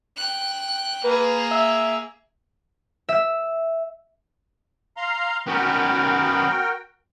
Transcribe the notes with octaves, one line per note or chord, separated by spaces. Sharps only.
G5 F#6
A#3 G#4 B4
E5
E5
F5 A#5 C6
B3 C#4 F#4 A#4 G5